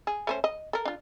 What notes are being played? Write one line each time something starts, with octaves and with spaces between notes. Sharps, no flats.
G#4
A3 C#4 C5
D#5
A4 A#4
D4 F4